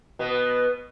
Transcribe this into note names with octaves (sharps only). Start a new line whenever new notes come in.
B2 B3